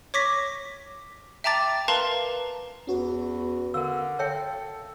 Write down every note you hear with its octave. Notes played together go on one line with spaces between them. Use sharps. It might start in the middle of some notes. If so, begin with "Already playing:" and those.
C#5 C#6 D6 A#6 B6
E5 G5 A5 A#5 D6 A6
A#4 B4 F5 A5 A#5 C6
E2 C#4 F#4 B4
D3 A#4 F5 E6
A4 C#5 E5 G5